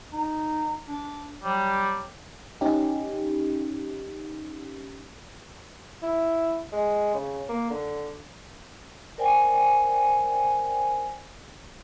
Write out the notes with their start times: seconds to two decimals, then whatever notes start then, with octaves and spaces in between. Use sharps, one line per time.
0.13 D#4
0.88 D4
1.44 F#3 G3
2.61 C#4 D#4 G4
6.03 E4
6.73 G#3
7.14 C#3
7.49 A#3
7.71 D3
9.18 A#4 C5 D5 G5 G#5